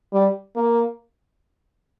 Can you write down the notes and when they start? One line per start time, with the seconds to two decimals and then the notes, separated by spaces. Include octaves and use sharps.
0.13 G3
0.56 A#3